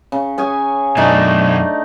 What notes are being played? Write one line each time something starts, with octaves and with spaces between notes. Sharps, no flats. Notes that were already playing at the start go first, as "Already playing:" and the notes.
C#3
C#4 G#4 G#5
F#2 B2 F#3 A3 D4 D#4